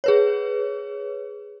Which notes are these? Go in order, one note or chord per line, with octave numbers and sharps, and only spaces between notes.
G#4 B4 C#5